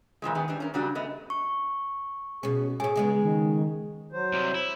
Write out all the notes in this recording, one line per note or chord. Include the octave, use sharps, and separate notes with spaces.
A#2 E3 F3 G#3
D#3 B3 G#4
E3 G3 D4
C#4 F4 A#4
A#2 C#3 F#3 G3 D4 F#4
A3 B3 D#5
C#6
B2 C#4 G#4
A2 C#4 G#4 G#5
C#3 G#3 B3
D#3
F#3 C5
C2 C3
E4